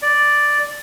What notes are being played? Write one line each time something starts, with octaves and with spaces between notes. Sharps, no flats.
D5